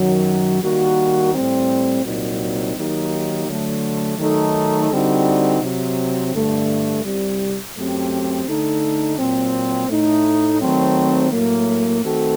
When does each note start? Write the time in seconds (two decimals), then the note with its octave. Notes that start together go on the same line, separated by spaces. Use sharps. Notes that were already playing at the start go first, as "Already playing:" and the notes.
Already playing: F#2 D#3 F#3
0.61 D#3 G3 A#3 F#4
1.33 A2 G3 C4
2.03 C2 A#2 F#3 C4 D#4
2.75 D#3 F#3 A#3 D#4 G4
3.47 D3 F#3 A3
4.17 D#3 F#3 A3 D#4 A4
4.89 D3 G3 C4 D#4 F#4
5.60 C3 F#3 C4
6.32 G2 D3 A3
7.04 C2 C3 G3
7.75 F#2 F#3 A3 C4 G4
8.45 D3 A3 D#4 A4
9.17 A#2 F#3 C4
9.88 A2 A3 D#4
10.60 D#3 F#3 A3 C4
11.31 A2 F#3 A#3
12.02 D#3 A3 C4 F#4 A4